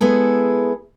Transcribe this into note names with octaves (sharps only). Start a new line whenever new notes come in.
G#3 B3 E4 G#4 A4